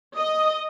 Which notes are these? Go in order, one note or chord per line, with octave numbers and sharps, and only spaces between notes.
D#5